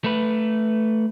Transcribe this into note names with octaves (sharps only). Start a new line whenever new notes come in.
A3 B4